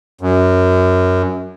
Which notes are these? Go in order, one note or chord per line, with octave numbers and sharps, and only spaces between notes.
F#2